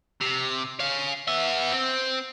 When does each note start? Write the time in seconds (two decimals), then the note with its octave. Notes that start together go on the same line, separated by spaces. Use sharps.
0.21 C3
0.80 C#5 F5
1.28 B3 E5
1.72 C4